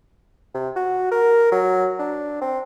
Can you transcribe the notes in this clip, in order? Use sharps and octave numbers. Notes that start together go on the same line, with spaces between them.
C3
F#4
A#4
F#3
D4
C4